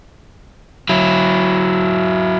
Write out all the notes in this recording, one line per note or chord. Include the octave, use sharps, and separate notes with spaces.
F#3 E4